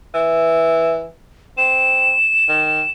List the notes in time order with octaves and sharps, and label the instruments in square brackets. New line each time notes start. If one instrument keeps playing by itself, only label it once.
[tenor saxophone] E3
[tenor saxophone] C4 [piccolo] E7
[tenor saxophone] D#3